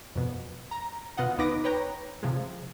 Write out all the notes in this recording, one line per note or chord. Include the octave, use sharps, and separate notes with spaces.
F2 B2
A#5
B2 F4 D#5 F#5
D#2 B3 D#4 B4 D6 A#6
B4 C#5 G5 A#5
C3 F3 G#3